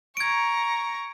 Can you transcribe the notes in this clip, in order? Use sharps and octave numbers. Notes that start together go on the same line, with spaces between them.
A#5 C#6 G#6 D7